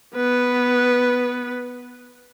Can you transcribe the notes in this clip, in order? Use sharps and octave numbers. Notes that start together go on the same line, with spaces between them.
B3 B4